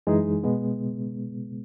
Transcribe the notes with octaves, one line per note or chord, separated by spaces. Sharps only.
F#2 E3 G#3 D#4 G#4
B2 G#3 B3